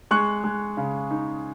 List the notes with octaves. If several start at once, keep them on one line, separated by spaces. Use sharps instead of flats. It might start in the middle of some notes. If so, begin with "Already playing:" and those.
G#3 C#6 F#6
G#3
C#3
D#4